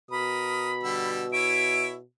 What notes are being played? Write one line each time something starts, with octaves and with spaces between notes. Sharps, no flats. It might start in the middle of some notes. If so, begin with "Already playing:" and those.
B2 A#4 B5 D#6
D3 G3 E6
E4 C#5 E5 D7